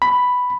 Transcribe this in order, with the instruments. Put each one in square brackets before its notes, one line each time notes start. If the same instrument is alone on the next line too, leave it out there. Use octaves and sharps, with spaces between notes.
[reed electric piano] B5